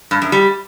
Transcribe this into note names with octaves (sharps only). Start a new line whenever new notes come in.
G2
F#2
G3